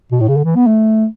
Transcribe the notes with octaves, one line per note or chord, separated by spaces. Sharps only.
B2
A2
C#3
D3
E3
B3
A3